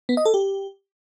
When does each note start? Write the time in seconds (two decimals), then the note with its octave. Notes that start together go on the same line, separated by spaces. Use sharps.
0.09 B3
0.17 D#5
0.25 A4
0.34 G4